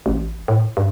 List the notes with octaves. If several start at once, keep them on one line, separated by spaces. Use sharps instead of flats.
A1
A2
G2